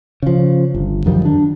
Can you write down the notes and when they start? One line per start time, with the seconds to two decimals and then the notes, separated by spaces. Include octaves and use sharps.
0.22 C#3 F3
0.74 G1
1.06 F#2 D#3 F3 G3
1.25 D4